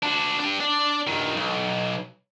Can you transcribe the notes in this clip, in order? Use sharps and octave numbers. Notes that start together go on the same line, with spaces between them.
D4 F#4
D4 G4
D4 D5
G2 D#3
B1